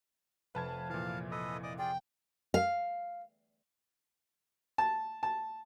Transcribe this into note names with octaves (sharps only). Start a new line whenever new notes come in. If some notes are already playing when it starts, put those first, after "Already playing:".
F1 B4 F5 A5 G#6
A#2 E3 F5 A5
A4 B4 D#5
D5 D#5 D6
F4 G#4 D5 G5
F5
A5
A5